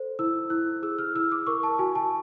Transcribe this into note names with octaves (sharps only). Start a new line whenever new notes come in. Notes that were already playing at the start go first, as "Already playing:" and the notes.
Already playing: A4 C5
E4 E6
E4 F#6
G#4 E6
F6
E4 E6
D6
A#4 C#6
A5
F#4 G#5
A5